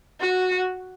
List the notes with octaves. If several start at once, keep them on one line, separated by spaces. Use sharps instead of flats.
F#4